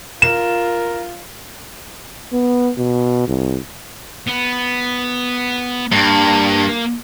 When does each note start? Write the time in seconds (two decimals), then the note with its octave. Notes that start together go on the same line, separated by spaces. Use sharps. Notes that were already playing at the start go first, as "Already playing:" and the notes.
0.22 F4 A#4 E7
2.32 B3
2.78 B2
3.28 C2
4.27 B3
5.92 G2 A#3